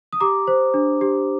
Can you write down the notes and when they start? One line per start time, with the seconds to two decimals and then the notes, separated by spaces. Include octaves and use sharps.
0.13 D#6
0.20 G4 A#5 D6
0.47 C5
0.74 D4
1.01 G4